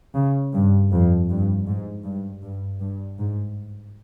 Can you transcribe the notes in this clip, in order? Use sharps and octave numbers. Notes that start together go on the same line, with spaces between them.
C#3
G2
F2
G2
G#2
G2
G2
G2
G#2